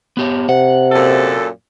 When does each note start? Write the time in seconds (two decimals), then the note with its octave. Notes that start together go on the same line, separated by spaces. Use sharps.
0.17 B3 G4 C#5
0.49 C3 F#5
0.92 F#2 A#2 A4